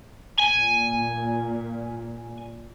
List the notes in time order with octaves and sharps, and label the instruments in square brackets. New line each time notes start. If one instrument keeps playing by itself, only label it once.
[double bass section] A#2 [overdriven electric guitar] G#5